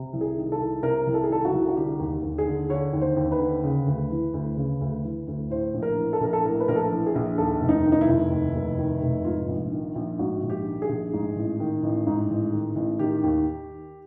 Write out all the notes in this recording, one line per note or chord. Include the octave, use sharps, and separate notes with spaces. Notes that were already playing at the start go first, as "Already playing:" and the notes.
Already playing: C3
C2
G#4
D#3
A4
C2
C3 A#4
C2
A4
G#4
D#3 A4
F#4
C2
F#4
D3 G4
D#2
D#2
G#4
D3
D3 C#5
D#2
C5
D#2
B4
D3
C#3
D2
E3
D2
C#3
D2
E3
D2
A2 C5
A#1
A#4
E3
A4
A#1 A#4
A4
A2 A#4
B4
A#1 A#4
A4
E3
G#4
A#1
D#2 A4
F1
D#4
D#3
D#4
E4
F1
D#2
F1
D#3
F1
G#2 F4
A#1
D#3
A#1
G#2 F#4
A#1
G4
D#3
G#4
A#1
G#2
A1
D#3
A1
G#2
A1
D#3
A1
D#3 G4
D#2